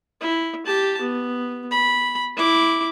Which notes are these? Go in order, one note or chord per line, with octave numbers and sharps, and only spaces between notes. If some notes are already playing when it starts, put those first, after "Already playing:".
E4
G4 A5
B3
B5
E4 D6